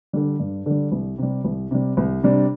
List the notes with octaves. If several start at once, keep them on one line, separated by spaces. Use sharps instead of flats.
D3 G3
G2
D3 G3
C2
C3 G3
C2
C3 G3
C2
C3 G3 D4